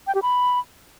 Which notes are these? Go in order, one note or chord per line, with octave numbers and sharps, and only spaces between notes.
G5
G4
B5